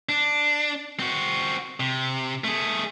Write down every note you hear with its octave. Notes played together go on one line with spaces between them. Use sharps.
D4
C4 F#4
C3
A3 G#4